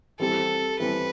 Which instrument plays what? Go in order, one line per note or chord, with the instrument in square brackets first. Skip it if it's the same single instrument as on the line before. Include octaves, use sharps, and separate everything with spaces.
[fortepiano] E3 G3 C4 G4 [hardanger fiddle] A4
[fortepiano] E3 G3 C4 G4 [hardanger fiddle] B4